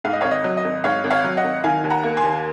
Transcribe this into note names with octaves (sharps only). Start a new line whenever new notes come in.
G#2 F5
D#5
G#1 C#5 F5
D#5
F#3
D#5
G#1
G#2 C#5 F5
G#1
C#5 F5
F#3
D#5 F#5
G#1
D#3 F5 G#5
D#2
F#5 A#5
A#3
G#5 C6
D#2